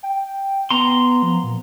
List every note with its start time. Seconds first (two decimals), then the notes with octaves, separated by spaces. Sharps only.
0.03 G5
0.70 B3 A#5 C6
1.22 F3
1.43 A#2